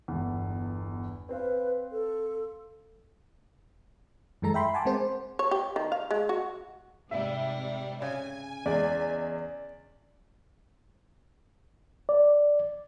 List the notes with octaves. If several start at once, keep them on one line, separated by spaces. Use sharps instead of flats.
G1 E2
C4 B4 C5 F5
A4
F#2 E3 G#3 A4 A#5
E5 G5 B5 C6
F#5 G#5 A5 D6
G#3 C4 A#4 C5
C#5
G4
D#3
F5
G#3
F#4
G#2 C3 G3 E5
C#3 G#5
E2 G#3 D5
D5